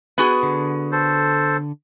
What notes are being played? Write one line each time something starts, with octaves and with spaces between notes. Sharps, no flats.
B3 F#4 G#4
D3
A4 C5